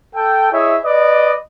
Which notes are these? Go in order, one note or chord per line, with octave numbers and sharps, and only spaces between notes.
A4 G5
E4 G#4 C#5 D#5 E5
B4 D5 D#5